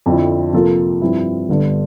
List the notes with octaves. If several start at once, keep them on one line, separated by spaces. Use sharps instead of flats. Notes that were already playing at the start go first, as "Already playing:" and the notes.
F2 D3 F3 C4 E4
C3 F3 A#3 F4 A4
G2 F3 C4 E4
G1 G2 D3